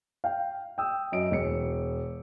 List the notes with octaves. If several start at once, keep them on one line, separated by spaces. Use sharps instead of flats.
F5 G5
G5 D#6 E6
F#2 D#5 D7
E1 C#7